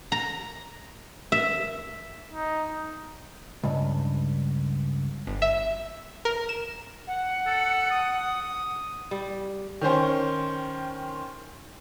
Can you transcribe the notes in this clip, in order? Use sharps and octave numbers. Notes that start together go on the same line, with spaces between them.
A#5
E5
D#4
C#2 G2
G1
E5
A#4
E7
F#5
A4
D#6
G3
D#3 C#4 C5 G5